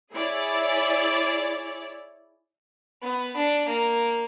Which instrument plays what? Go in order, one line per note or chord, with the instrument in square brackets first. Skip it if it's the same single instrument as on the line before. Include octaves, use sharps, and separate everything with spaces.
[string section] E4 G#4 C#5 D5
[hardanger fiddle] B3
D4
A#3